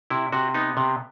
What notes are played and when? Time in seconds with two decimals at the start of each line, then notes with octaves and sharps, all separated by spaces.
0.10 C3 E4
0.32 C3 F#4
0.54 B3 D#4
0.77 C3